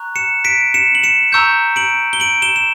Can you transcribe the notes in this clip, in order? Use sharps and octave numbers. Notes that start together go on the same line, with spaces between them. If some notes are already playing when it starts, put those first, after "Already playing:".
Already playing: A#5 C#6 F#6
C#7 E7
B6 D7
C#7 E7
F#7
C#7 E7
A#5 C#6 E6 G6
D7 F#7
G7
D7 F#7
E7 G7
E7